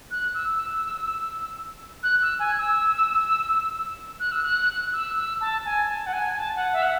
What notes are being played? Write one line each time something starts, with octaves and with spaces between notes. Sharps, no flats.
F#6
E6
F#6
E6
G#5
E6
F#6
E6
F#6
E6
E6
A5
G#5
A5
F#5
G#5
A5
F#5
E5
F#5